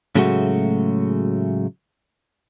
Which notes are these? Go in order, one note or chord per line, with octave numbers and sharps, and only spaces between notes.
A2 C#3 F#3 G#3 A3 F#4